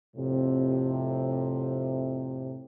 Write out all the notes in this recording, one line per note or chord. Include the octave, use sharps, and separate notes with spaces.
F2 A2 C3